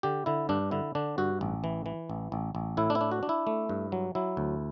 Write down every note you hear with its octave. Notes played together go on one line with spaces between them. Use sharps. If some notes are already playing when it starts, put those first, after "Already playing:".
D3 G4
D3 E4
G2 D4
D3 E4
D3 D4
G2 F#4
A1
E3
E3
A1
A1
A1
A2 E4
D4
E4
D4
F#4
D4
E4
A3
G2
F#3
F#3 E4
D2